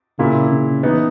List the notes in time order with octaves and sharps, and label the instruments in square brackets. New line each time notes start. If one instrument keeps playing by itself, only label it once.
[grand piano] A#2 A#3 E4 [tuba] C#3
[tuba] C#3
[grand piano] E3 B3 D#4